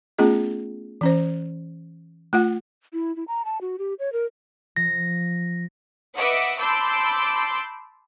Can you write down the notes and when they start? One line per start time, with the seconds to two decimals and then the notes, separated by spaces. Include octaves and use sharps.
0.19 A3 B3 C#4 F4 G#4 D#5
1.01 E3 C#4 C5
2.33 A3 F4 F#5
2.93 E4
3.16 E4
3.28 A#5
3.45 A5
3.61 F#4
3.79 G4
3.99 C#5
4.13 A#4
4.76 F3 A#6
6.17 B4 D#5 E5 F#5 D6
6.59 A5 B5 C6 D6 E6 G6